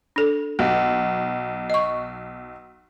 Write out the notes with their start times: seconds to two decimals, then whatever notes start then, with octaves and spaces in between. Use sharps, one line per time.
0.16 D4 A4
0.59 B1 F5
1.70 D#5 C#6